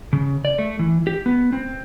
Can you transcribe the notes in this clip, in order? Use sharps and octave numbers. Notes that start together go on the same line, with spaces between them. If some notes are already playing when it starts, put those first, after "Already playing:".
C#3
D5
A3
E3
G4
B3
C4